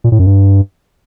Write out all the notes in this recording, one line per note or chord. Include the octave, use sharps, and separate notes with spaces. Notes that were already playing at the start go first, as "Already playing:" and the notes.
A#2
A2
F#2
G2